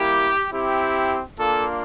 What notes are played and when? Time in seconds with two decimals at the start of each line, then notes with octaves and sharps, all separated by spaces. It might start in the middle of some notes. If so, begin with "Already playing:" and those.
Already playing: G3 A#3 E4 G4
0.51 C4 E4 G4
1.38 A#3 D4 F4 A4